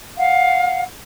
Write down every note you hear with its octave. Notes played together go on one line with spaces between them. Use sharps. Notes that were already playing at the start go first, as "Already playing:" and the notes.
F5 F#5